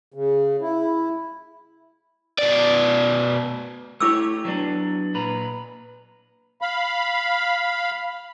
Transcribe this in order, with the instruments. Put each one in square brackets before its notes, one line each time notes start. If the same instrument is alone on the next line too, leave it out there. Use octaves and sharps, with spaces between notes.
[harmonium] C#3
E4
[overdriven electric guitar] B2 D5
[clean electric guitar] A3 G4 C#5 [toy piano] E4 D6 E6
[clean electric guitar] F#3 B3 D4
A#2 B4 A#5
[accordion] F5 B5